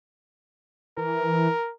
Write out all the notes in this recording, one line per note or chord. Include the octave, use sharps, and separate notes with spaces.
E3 A#4